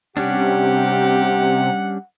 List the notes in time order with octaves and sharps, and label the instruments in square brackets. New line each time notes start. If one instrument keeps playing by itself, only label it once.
[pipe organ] C3 [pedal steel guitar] G3 C#4 D4 [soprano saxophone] G4 [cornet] F#5